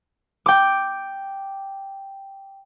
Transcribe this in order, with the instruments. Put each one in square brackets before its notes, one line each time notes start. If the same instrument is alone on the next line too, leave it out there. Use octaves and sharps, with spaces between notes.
[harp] G5 D6